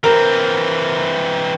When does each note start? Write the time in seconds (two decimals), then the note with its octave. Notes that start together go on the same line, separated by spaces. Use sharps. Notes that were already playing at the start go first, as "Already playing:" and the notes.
0.04 E3 C4 A#4